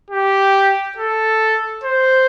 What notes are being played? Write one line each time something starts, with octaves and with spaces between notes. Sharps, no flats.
G4
A4
C5